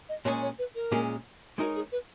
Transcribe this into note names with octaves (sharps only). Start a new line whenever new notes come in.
D#5
A#2 G#3 C#4 G#4 C#5
C#5
B4
A#4
A#2 G#3 C#4 G#4
G#3 D#4 F#4 A#4 C#5
G#4
B4